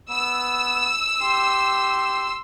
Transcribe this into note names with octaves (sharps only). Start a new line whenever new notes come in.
B3 E6
G4 C6